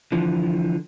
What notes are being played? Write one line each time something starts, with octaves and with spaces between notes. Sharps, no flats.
D3 E3 F3